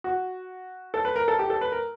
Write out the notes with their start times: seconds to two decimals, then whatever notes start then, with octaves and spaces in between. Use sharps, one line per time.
0.04 F#4
0.94 A4
1.05 B4
1.16 A#4
1.28 A4
1.39 G4
1.50 A4
1.61 B4
1.72 A#4